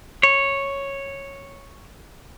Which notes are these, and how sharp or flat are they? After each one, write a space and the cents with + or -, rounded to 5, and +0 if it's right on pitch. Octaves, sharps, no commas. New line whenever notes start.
C#5 -5